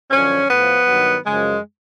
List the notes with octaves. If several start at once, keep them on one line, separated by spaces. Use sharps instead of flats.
F#2 D3 F3 C#4
A2 F3 B3
G2 D#3 F#3
F#2 C#3 F3 G#3